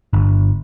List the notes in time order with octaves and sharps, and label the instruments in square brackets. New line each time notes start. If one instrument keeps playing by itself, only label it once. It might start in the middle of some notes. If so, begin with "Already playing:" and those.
[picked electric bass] G1